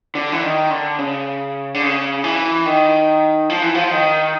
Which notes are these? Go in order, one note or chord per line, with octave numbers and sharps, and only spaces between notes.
D3
E3
D#3
D3
C#3
D3
C#3
E3
D#3
F3
E3
F3
D#3